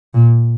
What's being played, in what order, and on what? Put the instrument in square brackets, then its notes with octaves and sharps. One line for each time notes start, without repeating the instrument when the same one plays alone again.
[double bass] A#2